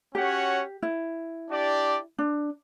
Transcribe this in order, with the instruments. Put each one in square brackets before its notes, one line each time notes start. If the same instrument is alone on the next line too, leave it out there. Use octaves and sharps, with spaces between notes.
[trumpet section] C#4 F#4 C#5 F#5 [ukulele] G4
[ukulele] E4
[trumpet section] D4 G4 D5
[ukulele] D4